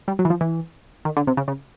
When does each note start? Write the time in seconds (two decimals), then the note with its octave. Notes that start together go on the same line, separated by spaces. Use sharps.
0.08 G3
0.19 F#3
0.25 E3
0.30 F3
0.41 E3
1.05 D#3
1.17 D3
1.27 C3
1.37 C#3
1.48 C#3